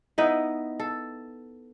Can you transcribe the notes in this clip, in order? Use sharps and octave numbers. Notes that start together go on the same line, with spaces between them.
B3 D#4 E4
A4